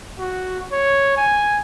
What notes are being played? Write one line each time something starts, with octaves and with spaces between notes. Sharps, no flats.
F#4
C#5
G#5